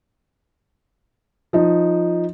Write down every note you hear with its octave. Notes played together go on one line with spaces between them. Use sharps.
F3 D#4